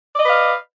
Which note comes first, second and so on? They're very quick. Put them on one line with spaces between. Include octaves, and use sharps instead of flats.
D5 D#5 B4 F5